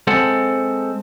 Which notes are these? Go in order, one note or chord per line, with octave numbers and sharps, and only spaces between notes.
G#3 C4 A4 C5 F#5